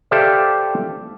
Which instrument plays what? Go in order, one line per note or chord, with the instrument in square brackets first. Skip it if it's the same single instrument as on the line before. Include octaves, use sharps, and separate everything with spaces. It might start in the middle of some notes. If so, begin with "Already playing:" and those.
[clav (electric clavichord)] G4 A4 C5 D5 E5 F5